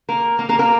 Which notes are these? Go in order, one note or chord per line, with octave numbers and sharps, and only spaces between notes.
A#3 A#4
A#3 A#4
A#3 A#4
A#3 A#4